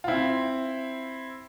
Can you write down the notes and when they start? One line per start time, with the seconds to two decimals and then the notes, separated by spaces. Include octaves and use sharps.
0.04 F4
0.08 C4 E4